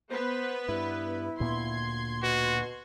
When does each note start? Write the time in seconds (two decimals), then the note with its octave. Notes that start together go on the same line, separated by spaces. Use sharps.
0.11 B3 B4 C5
0.69 G2 E4
1.40 D2 A#2 B3 C6 G#6
2.23 B2 F#4